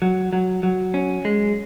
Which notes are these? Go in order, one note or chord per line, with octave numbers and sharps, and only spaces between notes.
F#3
F#3
F#3
C#4
G#3